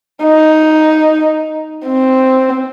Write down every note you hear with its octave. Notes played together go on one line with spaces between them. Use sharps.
D#4
C4